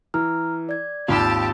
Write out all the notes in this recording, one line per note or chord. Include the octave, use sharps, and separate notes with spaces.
E3 A#5 F6
D5 G#6
G#1 D#2 F4 G4 A5 B5 E6